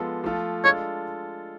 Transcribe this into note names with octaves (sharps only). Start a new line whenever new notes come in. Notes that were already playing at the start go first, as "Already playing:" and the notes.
Already playing: F3 G#3 B3 F4 A4
F3 A3 F4 A4
G#3 D4 F4 A4 C#5